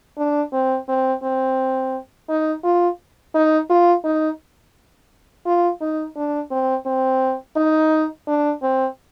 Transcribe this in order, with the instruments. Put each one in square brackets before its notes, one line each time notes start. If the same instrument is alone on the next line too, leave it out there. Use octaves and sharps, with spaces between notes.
[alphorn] D4
C4
C4
C4
D#4
F4
D#4
F4
D#4
F4
D#4
D4
C4
C4
D#4
D4
C4